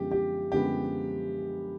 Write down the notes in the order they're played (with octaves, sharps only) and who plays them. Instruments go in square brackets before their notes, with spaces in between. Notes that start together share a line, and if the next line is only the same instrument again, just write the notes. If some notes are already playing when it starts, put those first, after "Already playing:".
Already playing: [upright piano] F#2 D3 F3 G#3 B3 [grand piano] G4
[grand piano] G4
[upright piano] F#2 D3 F3 G#3 B3 [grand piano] G4